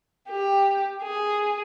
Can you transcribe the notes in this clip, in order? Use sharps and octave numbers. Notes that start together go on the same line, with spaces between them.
G4
G#4